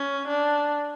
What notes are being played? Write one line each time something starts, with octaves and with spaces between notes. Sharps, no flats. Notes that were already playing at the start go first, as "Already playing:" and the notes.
Already playing: C#4
D4